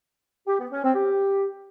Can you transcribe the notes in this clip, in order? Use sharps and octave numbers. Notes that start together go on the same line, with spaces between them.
G4
B3
C#4
C4
G4